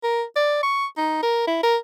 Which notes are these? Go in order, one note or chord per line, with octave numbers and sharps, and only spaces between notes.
A#4
D5
C#6
D#4
A#4
E4
A#4